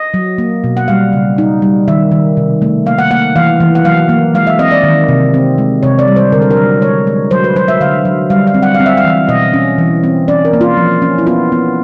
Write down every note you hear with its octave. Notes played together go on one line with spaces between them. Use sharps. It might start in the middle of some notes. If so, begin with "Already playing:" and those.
Already playing: D#5
F#3
A#3
B2
F#5
G3 F5
C#3
D#4
G3
D#3 E5
D#3
C3
A3
A#3 F5
F#5
A#3 F#5
E3 F5
E3
F#5
F#3 F5
A#3
G#3 F5
E5
C4 D#5
D5
D#3
C3
C4
G#3
C3 C#5
D5
G3
C5
D3 A#4
A4
A#4
F#3
G#3 C#5
G#3
F#3 C5
B4
F#3 C5
E5
D3 F5
F#3
G3 F5
F5
C4
F#5
F5
C4
E5
F5
E3
B2 D#5
C#4
E3
C4
C#4 D5
A#4
A#3
F4
F3
C#4
E4
B3 F4
B3